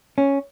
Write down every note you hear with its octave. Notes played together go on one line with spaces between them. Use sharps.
C#4